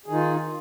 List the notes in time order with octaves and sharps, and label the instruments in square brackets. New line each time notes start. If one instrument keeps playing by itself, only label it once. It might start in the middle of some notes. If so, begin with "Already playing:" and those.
[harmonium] G#4
D#3
D#4
F4